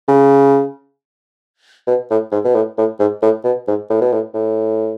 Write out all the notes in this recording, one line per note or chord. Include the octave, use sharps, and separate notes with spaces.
C#3
B2
A2
G#2
B2
A2
A2
G#2
A2
B2
G#2
A2
B2
A2
A2